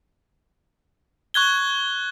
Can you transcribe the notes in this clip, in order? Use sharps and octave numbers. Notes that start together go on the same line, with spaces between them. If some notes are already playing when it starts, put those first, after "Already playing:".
C#6 F#6 G#6 G7